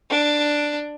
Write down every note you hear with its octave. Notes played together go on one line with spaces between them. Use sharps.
D4